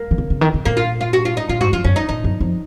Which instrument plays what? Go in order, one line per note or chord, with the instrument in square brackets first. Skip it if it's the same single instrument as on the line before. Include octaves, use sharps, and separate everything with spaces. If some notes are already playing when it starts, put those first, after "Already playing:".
Already playing: [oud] A#3
[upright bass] D#3
C#3
C#3
D#3
C#3
[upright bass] A#2 [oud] A#3
[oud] F4
F4
F#4
F4
D#4
[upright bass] A#2 [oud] F4
[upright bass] G#2 [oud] F#4
[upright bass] F2 [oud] F4
[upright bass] F#2 [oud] C#4
[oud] D#4
[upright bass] A#2 [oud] D#4
[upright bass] F#2
F2